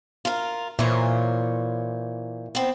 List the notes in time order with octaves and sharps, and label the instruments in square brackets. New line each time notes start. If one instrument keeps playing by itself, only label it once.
[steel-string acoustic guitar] F4 A#4
[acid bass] A#2 [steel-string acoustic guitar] E3 C5 C#5
[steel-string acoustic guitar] B3 C4